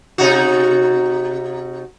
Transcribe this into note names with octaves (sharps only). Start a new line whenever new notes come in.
C3 D#4 F#4